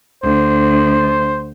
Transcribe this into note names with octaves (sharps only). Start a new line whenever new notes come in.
D2 C5